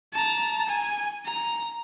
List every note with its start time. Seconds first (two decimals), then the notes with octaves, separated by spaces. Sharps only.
0.14 A5 A#5
0.68 G#5
1.26 A#5